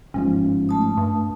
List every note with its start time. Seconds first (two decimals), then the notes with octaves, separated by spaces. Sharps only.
0.14 G1 G#2 F3 C#4
0.69 A3 A5 D#6
0.97 G2